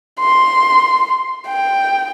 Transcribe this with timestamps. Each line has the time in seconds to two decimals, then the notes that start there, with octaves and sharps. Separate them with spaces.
0.20 C6
1.48 G5